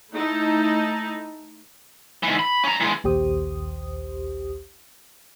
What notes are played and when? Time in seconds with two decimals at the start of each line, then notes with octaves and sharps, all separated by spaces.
0.13 A3 D#4 E4 A5
2.23 G#2 E3
2.39 B5
2.64 C#4 A#5
2.81 E3 G#3
3.04 A#1 D#2 G4 C5 D#6